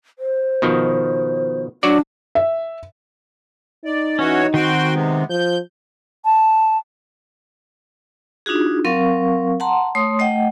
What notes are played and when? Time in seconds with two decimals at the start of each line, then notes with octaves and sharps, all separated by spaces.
0.18 C5
0.62 B2 D#3 F3
1.83 F#3 D4 F#4 D5
2.35 E5
3.85 D#4 D5
4.19 E3 C#4 F#4 C#5
4.54 D#3 C4 F#4 G5 C6
4.94 C3 G#3 B3
5.30 F3 G6
6.25 A5
8.46 D4 D#4 F4 F#4 G#4
8.85 F#3 C4 A#4 F5 C#6
9.60 F#5 A5 A#5 C6
9.95 A3 C#5 C6 D#6
10.19 A3 D#5 F#5 G5